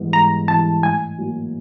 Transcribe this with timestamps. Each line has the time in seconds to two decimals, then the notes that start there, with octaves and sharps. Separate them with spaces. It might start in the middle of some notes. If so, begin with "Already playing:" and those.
Already playing: G#2 E3 G3 B3
0.13 G#2 A#5
0.48 E3 G3 B3 A5
0.83 A2 G#5
1.18 F#3 A#3